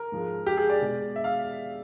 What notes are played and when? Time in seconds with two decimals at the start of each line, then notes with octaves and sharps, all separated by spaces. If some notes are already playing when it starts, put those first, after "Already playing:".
Already playing: A#4
0.12 G#2 F3 G#3
0.46 G4
0.57 G#4
0.70 D5
0.81 B2 G#3
1.16 E5
1.24 F5